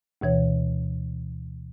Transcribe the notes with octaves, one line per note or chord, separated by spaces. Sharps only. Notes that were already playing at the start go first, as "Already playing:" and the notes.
D2 B2 E3 C#5